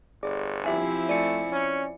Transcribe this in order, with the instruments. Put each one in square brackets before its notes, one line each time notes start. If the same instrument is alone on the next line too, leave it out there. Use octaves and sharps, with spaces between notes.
[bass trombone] G1 [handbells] G#4 D5 D6
[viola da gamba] F3 C4 E4 [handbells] G4 E5 G#5
[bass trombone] A3 [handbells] D5 G#5 C#7
[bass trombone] C#4